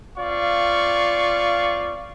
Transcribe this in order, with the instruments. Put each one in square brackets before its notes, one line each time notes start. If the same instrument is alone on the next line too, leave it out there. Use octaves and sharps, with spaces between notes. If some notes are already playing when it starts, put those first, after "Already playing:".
[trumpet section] C4 F4 D5 F5 C#6